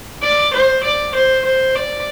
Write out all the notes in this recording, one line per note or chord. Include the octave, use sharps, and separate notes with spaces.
D5
C5
D5
C5
C5
D5